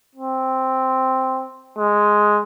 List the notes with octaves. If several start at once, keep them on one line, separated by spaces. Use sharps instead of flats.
C4
G#3